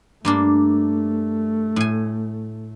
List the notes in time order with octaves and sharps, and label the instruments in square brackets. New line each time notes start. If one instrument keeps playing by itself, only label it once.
[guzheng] G2 A#3 D4 [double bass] A3
[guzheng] A2 G#5